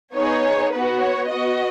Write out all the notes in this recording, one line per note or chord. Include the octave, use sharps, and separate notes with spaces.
B3 D#4 G#4 C#5
B3 F#4 B4
C#5
B3 F#4 D#5